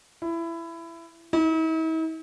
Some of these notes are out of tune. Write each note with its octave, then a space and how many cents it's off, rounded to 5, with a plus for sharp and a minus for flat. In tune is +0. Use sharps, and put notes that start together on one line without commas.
E4 +20
E4 -45